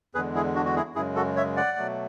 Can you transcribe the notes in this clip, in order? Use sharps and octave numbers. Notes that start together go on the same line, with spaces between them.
E2 D3 G#3 G#4 B4
E4 G#4
D4 F#4
F#4
E4 G#4
F#2 C#3 G#3 E4 G#4
F#4 A4
C#5 E5
D5 F#5
B2 F#3 A3